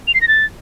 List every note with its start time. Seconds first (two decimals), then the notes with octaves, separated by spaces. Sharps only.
0.07 F7
0.14 C7
0.21 A#6
0.28 A6